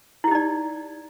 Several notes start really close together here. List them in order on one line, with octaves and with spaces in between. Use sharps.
E4 G4 D#4 D5